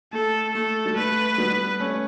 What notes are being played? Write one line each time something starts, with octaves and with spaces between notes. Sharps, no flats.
A3 A4
A3 A4
G3
A3 B4
G3 B3
A3 C#4